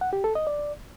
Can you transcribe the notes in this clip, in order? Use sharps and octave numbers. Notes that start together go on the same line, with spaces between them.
F#5
G4
A4
D#5
D5